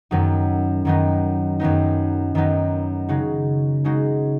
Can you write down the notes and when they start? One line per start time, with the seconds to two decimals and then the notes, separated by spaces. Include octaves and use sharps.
0.11 F#2 D#3 F#3 B3 D#4
0.85 F#2 D#3 F#3 B3 D#4
1.60 F#2 D#3 F#3 B3 D#4
2.35 F#2 D#3 F#3 B3 D#4
3.09 C#3 G#3 D#4 F#4
3.84 C#3 G#3 D#4 F#4